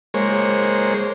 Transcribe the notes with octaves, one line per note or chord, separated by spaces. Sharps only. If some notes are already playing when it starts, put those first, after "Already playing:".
G#3 A#3 C5 C#5